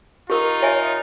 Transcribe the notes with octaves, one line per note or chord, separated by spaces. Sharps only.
D#4 F4 G4 A#4
C#5 E5 G#5